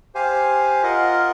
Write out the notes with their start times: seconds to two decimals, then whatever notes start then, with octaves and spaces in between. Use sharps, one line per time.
0.15 G4 C5 F5 G#5
0.83 F4 A#4 D#5 F#5